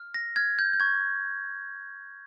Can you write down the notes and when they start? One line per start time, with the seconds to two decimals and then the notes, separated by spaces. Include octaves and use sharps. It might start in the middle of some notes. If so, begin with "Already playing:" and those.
Already playing: F6
0.14 A#6
0.36 F6 G#6
0.59 G6
0.73 G6
0.80 C#6 G#6